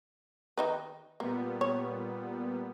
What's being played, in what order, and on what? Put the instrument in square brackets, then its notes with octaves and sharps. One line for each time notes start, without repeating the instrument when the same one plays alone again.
[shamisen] D#3 D#4 B4
[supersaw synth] A#2 G3 B3 [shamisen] A#3
[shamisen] C#5